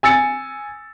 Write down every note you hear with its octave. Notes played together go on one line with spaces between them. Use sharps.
G#5 E6 A6 C#7